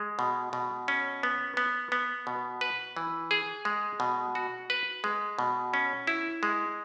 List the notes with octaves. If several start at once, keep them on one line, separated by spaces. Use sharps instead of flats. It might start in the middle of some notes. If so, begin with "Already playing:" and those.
Already playing: G#3
B2
B2
C#4
B3
B3
B3
B2
B4
E3
G#4
G#3
B2
F#4
B4
G#3
B2
C#4
E4
G#3